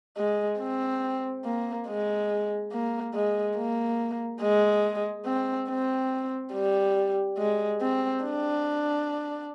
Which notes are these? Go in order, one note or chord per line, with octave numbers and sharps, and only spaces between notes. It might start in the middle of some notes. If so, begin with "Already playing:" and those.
G#3
C4
A#3
G#3
A#3
G#3
A#3
G#3
C4
C4
G3
G#3
C4
D4